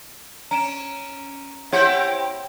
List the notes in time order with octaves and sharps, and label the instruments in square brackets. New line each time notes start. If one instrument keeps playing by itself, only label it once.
[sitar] C#4 [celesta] A#5 D7 E7
[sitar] C4 E4 G4 [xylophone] C#5 F#5 G6